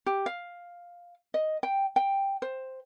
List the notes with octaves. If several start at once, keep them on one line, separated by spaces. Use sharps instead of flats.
G4
F5
D#5
G5
G5
C5